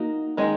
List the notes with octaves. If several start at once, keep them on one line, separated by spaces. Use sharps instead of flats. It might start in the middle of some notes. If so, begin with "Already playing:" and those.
Already playing: A#3 D#4 F#4
D#3 G#3 D#4